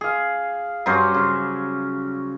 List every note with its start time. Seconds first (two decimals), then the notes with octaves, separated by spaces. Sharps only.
0.01 G#4 F5
0.86 G2 F#3 C#4 C5
1.14 C#3